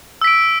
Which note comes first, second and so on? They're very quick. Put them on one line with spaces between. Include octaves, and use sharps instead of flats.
E6 B6 D7